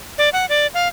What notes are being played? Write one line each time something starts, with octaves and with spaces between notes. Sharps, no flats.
D5
F#5
D5
F5